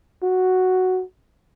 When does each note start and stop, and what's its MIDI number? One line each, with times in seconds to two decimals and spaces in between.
0.23 1.02 66